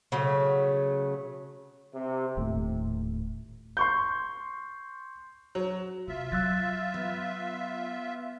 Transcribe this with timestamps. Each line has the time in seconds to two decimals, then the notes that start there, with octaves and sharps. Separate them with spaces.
0.12 C#3 F#3 A3
1.95 C3
2.37 D#1 A2
3.77 C6 C#6 G6
5.55 F#3
6.08 C3 F4 E5
6.32 F#3 E6 F#6 A6
6.94 B3